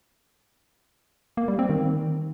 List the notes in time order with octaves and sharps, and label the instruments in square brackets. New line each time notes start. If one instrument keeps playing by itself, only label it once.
[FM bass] A#3
G3
C4
D#3